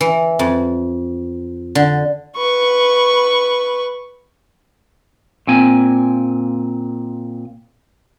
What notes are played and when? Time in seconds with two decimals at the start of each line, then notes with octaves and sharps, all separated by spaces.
0.01 E3
0.39 F2
1.75 D3
2.36 B4 C#6
5.47 A#2 C4 G#5